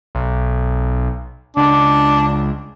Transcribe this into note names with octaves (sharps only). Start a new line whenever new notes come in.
B1
C#2 D4